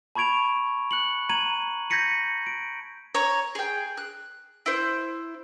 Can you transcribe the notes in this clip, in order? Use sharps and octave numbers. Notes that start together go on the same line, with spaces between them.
A5 B5 C#6 G#6 D7 F7
F#6 C#7 F#7
A#5 G#6 D#7 F#7
G6 G#6 A#6 B6 C#7 D#7
D7
C#5 A#5
G#4 G5
F#6
E4 C5